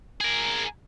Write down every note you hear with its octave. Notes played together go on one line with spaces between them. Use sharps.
G#4 A#4